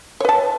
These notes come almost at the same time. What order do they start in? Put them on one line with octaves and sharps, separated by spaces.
C#5 B4 A5